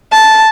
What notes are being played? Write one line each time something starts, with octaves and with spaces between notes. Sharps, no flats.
A5